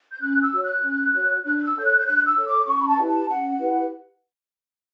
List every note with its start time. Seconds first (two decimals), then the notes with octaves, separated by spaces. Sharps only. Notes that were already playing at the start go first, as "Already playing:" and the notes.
0.11 G6
0.20 C#4 F#6
0.41 E6
0.52 F#4 C#5
0.62 F#6
0.82 C#4
1.13 F#4 C#5
1.44 D4 F#6
1.56 F#6
1.64 E6
1.75 A4 C#5 G6
1.85 F#6
1.98 G6
2.05 D4 F#6
2.26 E6
2.36 A4 C#5
2.46 D6
2.67 C#4 C#6
2.80 B5
2.87 A5
2.97 E4 G4 B4
3.08 A5
3.29 C#4 F#5
3.59 E4 G4 B4